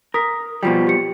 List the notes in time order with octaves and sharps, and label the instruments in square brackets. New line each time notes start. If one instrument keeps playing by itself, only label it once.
[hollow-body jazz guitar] A#4 [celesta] D#6 B6
[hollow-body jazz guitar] B2 F3 G3 [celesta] F4 G5
[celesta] G4 C#7